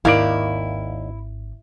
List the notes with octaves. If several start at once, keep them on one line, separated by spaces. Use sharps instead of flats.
G#1 D#2 E4 A#4 D5 F5